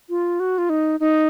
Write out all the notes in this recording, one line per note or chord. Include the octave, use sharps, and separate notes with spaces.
F4
F#4
F4
D#4
D#4